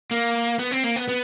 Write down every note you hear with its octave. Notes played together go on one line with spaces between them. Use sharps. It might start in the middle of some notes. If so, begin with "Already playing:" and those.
A#3
B3
C4
A#3
B3
B3